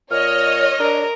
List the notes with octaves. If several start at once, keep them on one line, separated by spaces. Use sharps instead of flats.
A#2 C#5 D#5 F6
D4 A#4